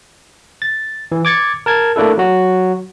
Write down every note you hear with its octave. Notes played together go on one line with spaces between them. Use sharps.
A6
E3
D6 G#6 A6 C#7
A#4 A5 G#6
A3 A#3 D4 E4 A4
F#3 F#4